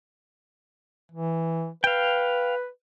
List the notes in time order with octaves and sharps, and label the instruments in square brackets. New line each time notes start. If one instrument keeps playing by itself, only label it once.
[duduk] E3
[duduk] B4 [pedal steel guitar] F5 G5